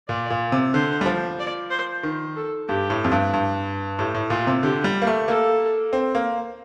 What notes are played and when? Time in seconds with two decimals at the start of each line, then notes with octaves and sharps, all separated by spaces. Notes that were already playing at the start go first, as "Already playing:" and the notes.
0.08 A#2 D5
0.30 A#2
0.52 C3
0.74 D3 C5
1.01 G3
1.06 F3
1.39 D5
1.71 C5
2.03 D#3
2.36 A4
2.68 G2 G4
2.90 A2
3.04 F2
3.12 G2
3.33 G2
3.99 A2 G4
4.14 A2
4.30 A#2 F4
4.47 C3
4.63 D3 G4
4.84 G3
5.02 A#3
5.07 A3
5.28 A#3 A4
5.93 C4
6.15 A#3